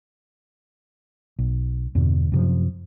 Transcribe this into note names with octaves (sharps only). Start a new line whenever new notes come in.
B1
E2 G2 B2 D3
F#2 C3 F3